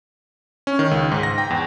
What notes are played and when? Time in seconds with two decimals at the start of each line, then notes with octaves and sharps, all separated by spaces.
0.67 C#4
0.79 D#3
0.91 C#2
1.12 G#2
1.23 A#6
1.38 G5
1.50 E2